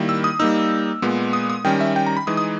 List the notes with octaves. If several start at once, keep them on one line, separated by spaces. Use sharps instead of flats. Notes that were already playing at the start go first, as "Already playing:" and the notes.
Already playing: D#3 G3 A#3 E4
E6
D#6
G3 A#3 D#4 E6
A#2 G#3 B3
D#6
D#6
D#3 G3 C#4 G5
E5
G5
A#5
B5
E3 G#3 D#4 D#6
D#6